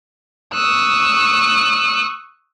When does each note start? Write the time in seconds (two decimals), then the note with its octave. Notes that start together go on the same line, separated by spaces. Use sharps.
0.54 C#6 D#6 E6 F#6